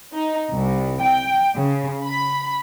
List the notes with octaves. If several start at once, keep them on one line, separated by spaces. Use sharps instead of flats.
D#4
C2
G5
C#3
B5